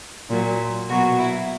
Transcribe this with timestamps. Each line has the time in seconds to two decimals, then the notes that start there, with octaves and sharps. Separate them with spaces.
0.29 A#2 F#3
0.89 B2 F#3 F#4
1.18 E4